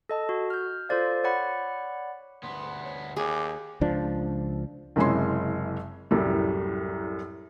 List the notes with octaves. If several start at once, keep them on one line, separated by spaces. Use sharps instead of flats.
A4 D#5 A5
F#4
F6 G6
F4 A4 C5 D5 F5
C#5 D5 F#5 B5
D2 B3 C6
C#5
D#2 G#4 D6
C#2 F3 D4
F#1 C3 G#3 C#4 E4 C6
C2 F#2 A2 G3